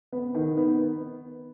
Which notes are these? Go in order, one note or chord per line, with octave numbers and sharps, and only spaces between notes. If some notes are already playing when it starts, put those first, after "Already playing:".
B3
D#3
B3